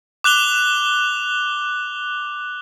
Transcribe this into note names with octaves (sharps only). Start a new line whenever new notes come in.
D6 F#6 F7 G7